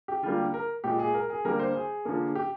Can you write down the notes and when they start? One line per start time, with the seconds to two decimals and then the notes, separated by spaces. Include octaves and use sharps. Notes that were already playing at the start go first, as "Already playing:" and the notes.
0.08 G4
0.23 D3 G3 A#3 F4
0.38 G4
0.54 A#4
0.84 A#2 F3 G#3 G4
0.99 G#4
1.14 A#4
1.30 G#4
1.45 D3 G3 A#3 A#4
1.59 C5
1.75 G#4
2.05 D3 F3 A#3
2.35 G4